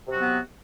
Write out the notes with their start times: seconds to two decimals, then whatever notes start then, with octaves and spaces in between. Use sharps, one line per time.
0.07 C3
0.11 F#4
0.15 F#3
0.20 B3